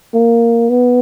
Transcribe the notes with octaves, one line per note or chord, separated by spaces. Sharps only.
A#3
B3